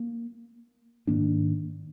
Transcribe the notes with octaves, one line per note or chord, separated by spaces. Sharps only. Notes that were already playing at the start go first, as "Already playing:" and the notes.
Already playing: A#3
G#2 D#3 A#3 D4